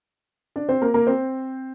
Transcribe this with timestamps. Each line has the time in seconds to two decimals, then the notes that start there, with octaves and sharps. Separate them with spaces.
0.56 D4 D5
0.69 C4 C5
0.82 A#3 A#4
0.94 A#3 A#4
1.07 C4 C5